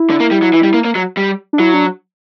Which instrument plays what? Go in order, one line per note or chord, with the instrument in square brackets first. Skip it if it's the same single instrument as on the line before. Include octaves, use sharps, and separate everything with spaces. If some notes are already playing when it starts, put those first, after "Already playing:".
Already playing: [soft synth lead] E4
[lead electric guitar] D3
A#3
G3
F#3
E3
G3
A#3
A#3
F#3
G3
[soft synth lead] D4
[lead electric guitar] F#3 [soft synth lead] E4
[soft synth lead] D4